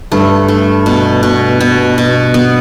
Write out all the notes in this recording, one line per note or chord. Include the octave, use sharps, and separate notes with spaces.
G2 A3
A3
B2
B2
B2
B2
B3